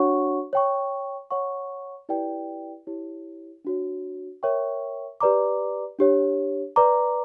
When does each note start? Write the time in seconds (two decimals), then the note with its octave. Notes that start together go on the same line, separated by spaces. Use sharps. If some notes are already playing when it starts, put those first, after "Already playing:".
Already playing: D4 F#4 C#5 F#5 C#6
0.53 C#5 G5 C#6
1.31 C#5 F#5 C#6
2.09 E4 G4 B4 D5 G5
2.87 E4 G4 C#5
3.65 D4 F#4 C#5
4.43 A#4 C#5 E5 G5 C#6
5.20 G4 B4 D5 A#5 D6
5.99 D4 G4 C#5
6.76 B4 D5 A#5 D6